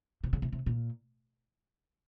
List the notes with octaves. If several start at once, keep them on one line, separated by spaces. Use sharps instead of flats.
C3
C#3
C3
C3
A#2